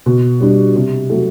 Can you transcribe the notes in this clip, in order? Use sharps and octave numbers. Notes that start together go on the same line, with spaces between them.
B2
G3 D4
C3
F#3 A3